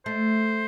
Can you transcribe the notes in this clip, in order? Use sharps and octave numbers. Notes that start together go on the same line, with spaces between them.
A3 C5